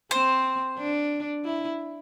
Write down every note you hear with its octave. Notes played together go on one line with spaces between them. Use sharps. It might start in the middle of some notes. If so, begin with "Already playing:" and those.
C4 C5
D4
E4